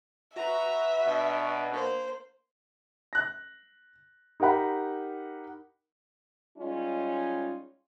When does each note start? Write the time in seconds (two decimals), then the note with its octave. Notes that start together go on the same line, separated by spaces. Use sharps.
0.36 F#4 B4 E5 A#5
1.07 B2 D4
1.72 A#3 C5
3.13 F#6 A#6
4.40 D#4 G4 A#4 F#5 B5
6.57 G3 G#3 C#4 D#4 F4